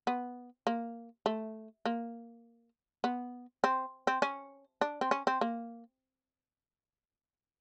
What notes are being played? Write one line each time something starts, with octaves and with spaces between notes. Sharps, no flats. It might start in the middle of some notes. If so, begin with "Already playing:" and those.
B3
A#3
A3
A#3
B3
C4
C4
C#4
D4
C4
C#4
C4
A#3